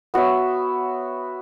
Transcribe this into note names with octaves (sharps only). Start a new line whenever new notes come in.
B3 F#4 C#5 E5